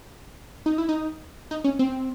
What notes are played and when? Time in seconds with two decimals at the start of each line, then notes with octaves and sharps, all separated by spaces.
0.66 D#4
0.78 E4
0.89 D#4
1.51 D#4
1.64 C#4
1.79 C4